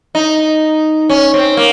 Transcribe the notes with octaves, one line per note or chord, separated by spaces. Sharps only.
D#4
C#4
C4
A#3